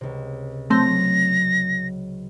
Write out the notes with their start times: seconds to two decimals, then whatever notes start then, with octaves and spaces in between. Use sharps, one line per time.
0.01 C#2 C3
0.70 F#3 A3 C4 A#6